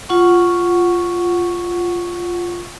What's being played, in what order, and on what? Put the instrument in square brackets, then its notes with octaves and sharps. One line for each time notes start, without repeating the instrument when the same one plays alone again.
[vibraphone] F4 F#5 C#6